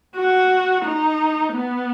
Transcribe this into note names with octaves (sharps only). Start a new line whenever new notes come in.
F#4
D#4
B3